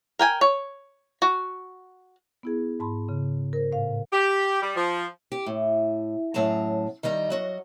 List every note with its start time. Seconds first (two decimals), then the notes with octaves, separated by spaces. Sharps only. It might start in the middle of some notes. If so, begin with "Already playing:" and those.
0.19 A#4 G5 G#5
0.41 C#5
1.22 F#4
2.43 B3 E4 G#4
2.80 G#2 A5 B5 C6
3.09 C#3
3.53 A#4 C5
3.72 A2 F5
4.11 G4
4.61 G3
4.76 F3
5.32 G4
5.46 A2
6.34 F#2 A2 F#3 G#4 A5 A#5
7.03 D#3 G3 D#5 A#5
7.30 F#3 F#4 D#5